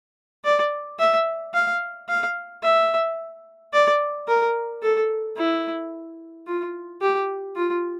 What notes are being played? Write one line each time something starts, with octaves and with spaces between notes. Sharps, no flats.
D5
E5
F5
F5
E5
D5
A#4
A4
E4
F4
G4
F4